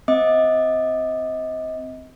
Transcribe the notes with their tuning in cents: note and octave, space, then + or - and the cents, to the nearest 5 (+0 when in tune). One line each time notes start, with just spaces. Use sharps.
C4 -15 D#5 +30 D6 +30